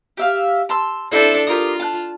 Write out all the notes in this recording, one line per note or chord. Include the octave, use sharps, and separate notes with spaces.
G4 E5 F5
A5 C6 E6
C4 D4 E4 A4 E5 G6
F4 G4 A#4 D#6
A5 F#6